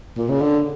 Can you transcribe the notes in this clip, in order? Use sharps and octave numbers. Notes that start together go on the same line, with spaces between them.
A#2
C#3
D3